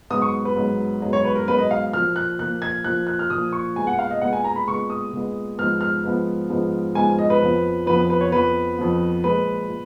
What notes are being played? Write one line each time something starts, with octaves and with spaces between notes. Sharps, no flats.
G#2 F#3 B3 D#6
C#6
B4
G#2 F#3 B3
G#2 F#3 B3
C#5
B4
A#4
G#2 F#3 B3 B4
D#5
F5
A#2 F3 A#3 F6
F#6
A#2 F3 A#3 F#6
G#6
A#2 F3 A#3 F#6
F#6
F6
A#2 F3 A#3 D#6
C#6
A#2 G#3 B3 G#5
F#5
F5
D#5
A#2 G#3 B3 F#5
G#5
A#5
B5
A#2 G#3 B3 C#6
D#6
A#2 G#3 B3
G#2 F3 B3 F6
F6
G#2 F3 B3
G#2 F3 B3
G#2 F3 B3 G#5
D#5
B4
F2 F3 B3
F2 F3 B3 B4
B4
C#5
F2 F3 B3 B4
F2 F3 B3
A#2 F3 G#3 B4
A#2